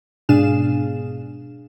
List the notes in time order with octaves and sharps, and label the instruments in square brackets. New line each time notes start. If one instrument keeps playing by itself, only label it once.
[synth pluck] G#2 B2 D4 G#4 F5 E7